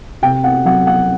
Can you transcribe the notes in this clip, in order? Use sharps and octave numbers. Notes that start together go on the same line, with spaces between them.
C3 G5
F#5
F#3 F#5
F#5